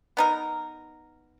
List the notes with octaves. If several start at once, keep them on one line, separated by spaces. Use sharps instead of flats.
B3 D#4 A#4